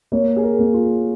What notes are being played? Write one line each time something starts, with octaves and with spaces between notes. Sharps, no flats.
A#3 C#5
G#4
A#4
A#3
F4